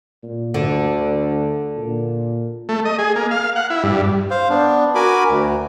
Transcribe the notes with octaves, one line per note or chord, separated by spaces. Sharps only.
A#2
D2 D3
A#2
A3
D#5
G#4
A#3
F5
F#5
E4
G2
C5 F5
B3 D4
F#4 A#4 G#5 B5 D6
D2